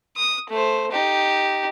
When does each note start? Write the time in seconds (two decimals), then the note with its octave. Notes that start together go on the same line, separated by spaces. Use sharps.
0.17 D#6
0.50 A3 C5
0.92 D#4 G4